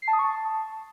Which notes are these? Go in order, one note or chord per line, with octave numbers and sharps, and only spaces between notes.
C7
A5
D#6
C#6
A5